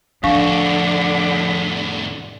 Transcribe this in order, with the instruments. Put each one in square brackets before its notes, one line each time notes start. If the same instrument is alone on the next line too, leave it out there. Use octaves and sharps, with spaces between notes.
[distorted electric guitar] F2 A2 [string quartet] D3 [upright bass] F3 [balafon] D4 F5 C#6